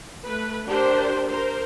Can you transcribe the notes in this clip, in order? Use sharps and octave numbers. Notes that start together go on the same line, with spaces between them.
A3 B4
D4 G4 A#4 C5
A#4 C5